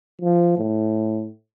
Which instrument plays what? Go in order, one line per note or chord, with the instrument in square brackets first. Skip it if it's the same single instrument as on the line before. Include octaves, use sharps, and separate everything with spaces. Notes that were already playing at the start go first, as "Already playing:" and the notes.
[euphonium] F3
A2